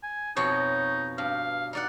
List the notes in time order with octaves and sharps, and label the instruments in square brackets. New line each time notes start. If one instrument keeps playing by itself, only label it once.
[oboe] G#5
[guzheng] F2 B2 C#5 [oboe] D#4
[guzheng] G2 [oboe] F5
[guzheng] D#4 D5 F#5